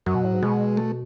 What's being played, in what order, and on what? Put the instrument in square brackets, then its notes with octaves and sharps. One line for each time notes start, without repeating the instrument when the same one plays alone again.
[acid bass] F#2 [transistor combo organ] F#3
[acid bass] B2
A2
G#2
[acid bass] B2 [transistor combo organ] G#3
[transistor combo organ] A3